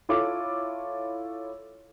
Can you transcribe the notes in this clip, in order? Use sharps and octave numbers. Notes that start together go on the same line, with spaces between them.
E4 F4 A4 C#5 D6